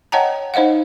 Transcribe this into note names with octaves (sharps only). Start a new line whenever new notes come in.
C#5 D#5 F#5 G5 A5 A#5
D#4 C5 D#5 F5 F#5